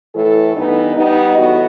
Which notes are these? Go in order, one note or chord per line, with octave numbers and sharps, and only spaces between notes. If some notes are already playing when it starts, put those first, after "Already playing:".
A2 E3 A3 E4 A4
G2 E3 B3 D#4
G3 B3 D#4
A2 E3 B3 F#4